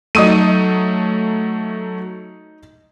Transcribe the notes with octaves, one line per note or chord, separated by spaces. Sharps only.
F#3 A3 D#4 D#6 D#7